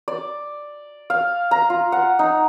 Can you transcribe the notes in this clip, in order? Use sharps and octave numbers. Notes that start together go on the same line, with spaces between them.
D5
F5
A#5
F4
F#5
D#4